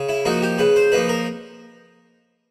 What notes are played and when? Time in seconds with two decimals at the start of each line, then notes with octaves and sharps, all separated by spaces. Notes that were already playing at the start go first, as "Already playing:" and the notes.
Already playing: C#3
0.09 E4
0.25 F3 A#3 D#4 F#4
0.42 G4
0.58 C#3 B4
0.76 C5
0.92 F3 A#3 D#4 B4
1.09 A#4